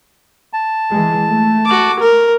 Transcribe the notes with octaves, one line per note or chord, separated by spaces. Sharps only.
A5
E3 G#3
A3
F#4 D6
A#4